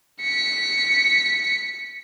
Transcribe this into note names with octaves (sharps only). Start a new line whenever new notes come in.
B6 C#7